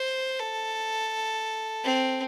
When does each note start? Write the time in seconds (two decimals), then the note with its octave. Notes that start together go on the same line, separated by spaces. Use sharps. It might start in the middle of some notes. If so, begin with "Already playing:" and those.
Already playing: C5
0.40 A4
1.84 C4